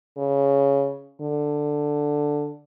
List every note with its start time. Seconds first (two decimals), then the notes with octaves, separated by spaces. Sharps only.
0.18 C#3
1.21 D3